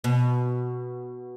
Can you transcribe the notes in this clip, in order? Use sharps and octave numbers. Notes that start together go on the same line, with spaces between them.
B2